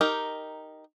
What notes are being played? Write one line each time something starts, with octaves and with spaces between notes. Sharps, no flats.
D#4 G4 A#4